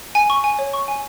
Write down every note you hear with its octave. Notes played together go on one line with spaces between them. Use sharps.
G#5
C#6
G#5
C#5
C#6
G#5